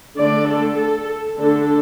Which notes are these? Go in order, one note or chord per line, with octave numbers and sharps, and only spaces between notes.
D3 A3 D4 D5
A4
A4
D3 A3 D4 A4